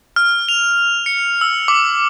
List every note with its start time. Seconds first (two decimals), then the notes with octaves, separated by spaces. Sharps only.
0.16 F6
0.49 F7
1.06 C#7
1.41 E6
1.68 D6